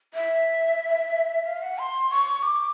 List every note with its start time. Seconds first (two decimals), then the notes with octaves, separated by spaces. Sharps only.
0.14 E5
1.46 F5
1.62 F#5
1.78 C6
2.10 C#6
2.43 D6